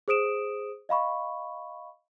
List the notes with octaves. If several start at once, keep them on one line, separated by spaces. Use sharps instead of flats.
G#4 C5 D#6 D7 E7
D#5 F5 B5 C#6